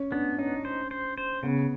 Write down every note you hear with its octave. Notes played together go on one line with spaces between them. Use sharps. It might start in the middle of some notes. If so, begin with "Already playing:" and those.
Already playing: C#4
B3 D4
C#4 D#4
C5
C5
C5
C#3 B3